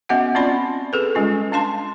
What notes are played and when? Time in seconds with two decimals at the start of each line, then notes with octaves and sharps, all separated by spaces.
0.09 B3 C#4 F#4 D#5 E5 F#5
0.35 C4 C#4 F4 D5 B5 C6
0.93 G#4 A4 B4
1.15 G3 G#3 C#4 F4
1.52 D4 F5 A5 C6